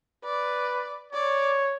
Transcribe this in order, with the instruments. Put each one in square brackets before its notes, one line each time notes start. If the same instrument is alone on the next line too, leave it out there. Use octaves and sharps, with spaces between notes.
[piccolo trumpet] B4 [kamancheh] D5
[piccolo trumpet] C#5 [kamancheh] D5